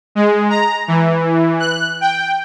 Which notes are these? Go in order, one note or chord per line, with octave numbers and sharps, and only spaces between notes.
G#3
A#5
E3
F#6
G5